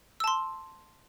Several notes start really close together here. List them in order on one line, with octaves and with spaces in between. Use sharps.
E6 A5 C6